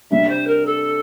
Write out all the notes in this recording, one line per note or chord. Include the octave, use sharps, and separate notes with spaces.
C3 G3 D4 E5
C5
A#4
A4